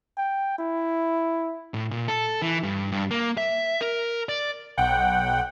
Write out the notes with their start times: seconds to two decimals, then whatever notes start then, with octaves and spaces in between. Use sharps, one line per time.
0.17 G5
0.58 E4
1.74 A2
1.91 A#2
2.08 A4
2.42 E3
2.63 G2
2.92 G2
3.11 A#3
3.37 E5
3.81 A#4
4.29 D5
4.78 B1 F#5 G5